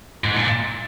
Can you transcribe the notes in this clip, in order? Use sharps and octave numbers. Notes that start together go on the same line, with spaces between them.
G#2
A#2